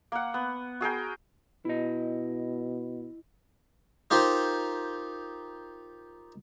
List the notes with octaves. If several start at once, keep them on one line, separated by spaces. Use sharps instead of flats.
A#3 F#5
B3
F#4 G#4 A#4 G5
B2 E4 D#5
D#4 F4 G4 A#4 C5